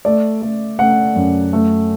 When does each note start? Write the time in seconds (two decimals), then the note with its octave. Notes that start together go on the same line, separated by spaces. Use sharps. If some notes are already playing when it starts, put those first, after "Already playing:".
0.05 A3 D5
0.42 A3
0.79 A3 F#5
1.16 F#2
1.53 A3